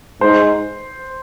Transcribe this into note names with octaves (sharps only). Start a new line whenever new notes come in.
G#2 C5